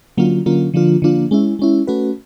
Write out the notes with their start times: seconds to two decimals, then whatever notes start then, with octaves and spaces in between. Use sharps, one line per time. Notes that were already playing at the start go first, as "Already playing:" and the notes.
0.18 D3 F#3 A#3 C#4 F4
0.46 D3 F#3 A#3 C#4 F4
0.74 D3 F3 A#3 D4 F4
1.02 D3 F3 A#3 D4 F4
1.31 G#3 C#4 E4
1.59 G#3 C#4 E4
1.87 A3 C#4 F#4 B4